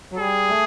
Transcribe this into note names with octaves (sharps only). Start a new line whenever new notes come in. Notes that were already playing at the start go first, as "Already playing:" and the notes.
F#3
G3 G#4
A3